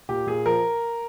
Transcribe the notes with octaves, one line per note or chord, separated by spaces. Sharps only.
A#2 G4
A#2 G#4
F3 A#4